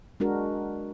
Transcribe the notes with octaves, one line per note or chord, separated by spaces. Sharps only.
G#3 D4 F#4 A#4